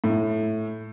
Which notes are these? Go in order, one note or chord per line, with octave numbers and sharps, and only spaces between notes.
A2